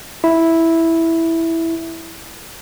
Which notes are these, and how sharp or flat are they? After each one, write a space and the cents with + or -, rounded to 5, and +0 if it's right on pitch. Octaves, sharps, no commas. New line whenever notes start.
E4 -5